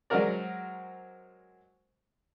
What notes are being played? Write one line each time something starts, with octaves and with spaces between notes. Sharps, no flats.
F#3 G#3 C4 F#4 A#4 D5